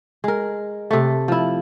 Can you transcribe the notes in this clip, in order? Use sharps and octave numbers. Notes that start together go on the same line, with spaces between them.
G#3 A#4
C3 A3
F3 E4